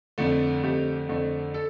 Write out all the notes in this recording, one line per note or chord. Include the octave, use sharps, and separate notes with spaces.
F2 D3 A3
F2 D3 A3 G4
F2 D3 A3
A4